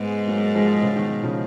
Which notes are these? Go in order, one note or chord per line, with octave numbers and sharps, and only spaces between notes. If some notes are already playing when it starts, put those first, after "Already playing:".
Already playing: G#2 G#3 B3
F#3 A#3
F3 G#3
C#3 F3
B2 D#3
C#3 F3